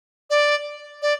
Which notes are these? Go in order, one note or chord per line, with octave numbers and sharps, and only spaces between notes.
D5
D5